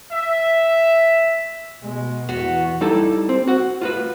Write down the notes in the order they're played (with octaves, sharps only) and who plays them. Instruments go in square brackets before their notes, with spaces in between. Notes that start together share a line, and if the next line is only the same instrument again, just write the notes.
[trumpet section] E5
[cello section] B2 [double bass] G#3
[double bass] E2 [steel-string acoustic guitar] B3 F#4
[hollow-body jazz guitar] G3 D#4 E4 A4
C4
F#4 F#5
F4 F#4 B4